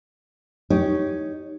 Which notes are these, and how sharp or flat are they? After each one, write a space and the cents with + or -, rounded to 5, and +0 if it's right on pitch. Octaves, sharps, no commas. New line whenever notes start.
D#4 +0 G4 -15 C#5 +0